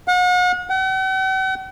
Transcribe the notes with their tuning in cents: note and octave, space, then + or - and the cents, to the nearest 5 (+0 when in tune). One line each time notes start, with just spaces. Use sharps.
F#5 -40
F#5 +45